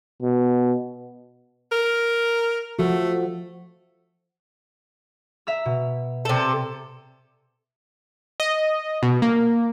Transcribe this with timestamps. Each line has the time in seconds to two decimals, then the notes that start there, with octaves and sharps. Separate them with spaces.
0.22 B2
1.72 A#4
2.79 F3 A3 F#4
5.47 E5 A#5 E6
5.65 B2
6.25 C3 A4
8.40 D#5
9.03 B2
9.22 A#3